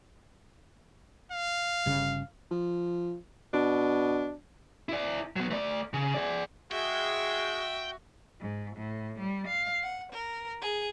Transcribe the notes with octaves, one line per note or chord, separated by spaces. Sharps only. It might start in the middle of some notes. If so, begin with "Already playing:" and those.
F5
G1 C#3
F3
B2 D4
E4 D5
F#3 B3
A3 D5
C#3
G#4 D5
G#3 F#4 G#4 E5 G5
G#2
A2
G3
F5
F#5
A#4
G#4